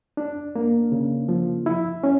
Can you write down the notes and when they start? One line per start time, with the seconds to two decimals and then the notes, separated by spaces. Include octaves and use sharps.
0.17 D4
0.56 A#3
0.92 C#3
1.29 F3
1.66 E4
2.04 C#4